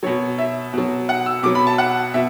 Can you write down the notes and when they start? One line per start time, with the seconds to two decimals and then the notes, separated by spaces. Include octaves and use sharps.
0.03 B2 F#3 C#5
0.38 E5
0.73 B2 F#3
1.09 F#5
1.26 E6
1.43 B2 F#3 D6
1.55 B5
1.67 A5
1.78 F#5
2.14 B2 E5